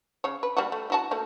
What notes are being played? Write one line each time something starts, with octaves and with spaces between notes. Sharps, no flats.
C#3 C#5
B4
G3 A#3 F#4
A3
E4 F#4 A5
A3 A#3